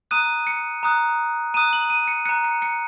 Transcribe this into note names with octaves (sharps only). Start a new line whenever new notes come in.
A#5 D#6 F#6 D#7
C#7
A#5 D#6 F#6
A#5 D#6 F#6 D#7
F#7
D#7
C#7
A#5 F#6 C#7
C#7
C#7